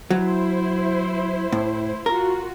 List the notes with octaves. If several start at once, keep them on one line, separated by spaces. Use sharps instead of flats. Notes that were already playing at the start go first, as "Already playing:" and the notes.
F#3 E4 C5
A2
F4 F#4 A#4